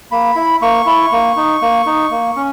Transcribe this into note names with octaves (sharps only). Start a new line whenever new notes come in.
A#3 B5
E4
A#3 C#6
E4
A#3
D#4
A#3
D#4
A#3
C#4